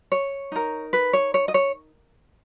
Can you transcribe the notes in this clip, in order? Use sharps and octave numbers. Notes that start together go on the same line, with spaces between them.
C#5
D#4 A#4
B4
C#5
C#5
D#5
C#5